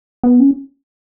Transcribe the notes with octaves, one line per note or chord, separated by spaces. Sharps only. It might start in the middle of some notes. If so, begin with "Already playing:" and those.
B3
C#4